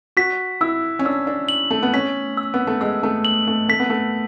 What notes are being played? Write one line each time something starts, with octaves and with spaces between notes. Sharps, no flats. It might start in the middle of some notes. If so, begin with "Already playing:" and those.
F#4 B6
E4 E6
C#4
D4 E6
D4
F#7
A3
B3
C#4 B6
E6
B3
A3
G#3 E6
A3
F#7
A3
A3 B6
B3
A3